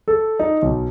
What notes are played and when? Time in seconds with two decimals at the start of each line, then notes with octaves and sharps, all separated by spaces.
0.08 A4
0.39 D#4
0.62 B1